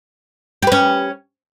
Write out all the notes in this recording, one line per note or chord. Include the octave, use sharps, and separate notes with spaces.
C#4 G4 B4